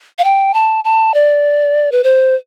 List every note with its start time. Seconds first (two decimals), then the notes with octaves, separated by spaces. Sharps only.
0.19 F5
0.24 G5
0.54 A5
0.84 A5
1.14 D5
1.92 B4
2.04 C5